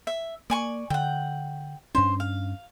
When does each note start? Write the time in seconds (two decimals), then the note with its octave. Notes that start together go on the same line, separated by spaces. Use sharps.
0.07 E5
0.50 A#3 D5 G#5 C#6
0.90 D3 F#5 G5
1.95 G2 C#4 D4 C5
2.20 F5